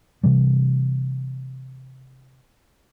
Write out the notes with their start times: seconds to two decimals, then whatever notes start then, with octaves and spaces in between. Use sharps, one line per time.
0.23 C3 E3 G3